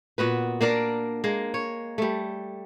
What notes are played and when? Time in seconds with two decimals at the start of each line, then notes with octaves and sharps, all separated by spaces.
0.18 A#2 B3 F#4 B4
0.61 A#3 D4 A#4 D5
1.24 G#3 A#3
1.54 C#5
1.98 G3 A3